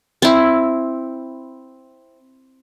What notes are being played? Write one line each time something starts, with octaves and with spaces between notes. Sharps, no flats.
C4 E4